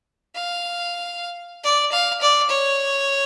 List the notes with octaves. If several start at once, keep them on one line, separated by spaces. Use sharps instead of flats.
F5
D5
F5
D5
C#5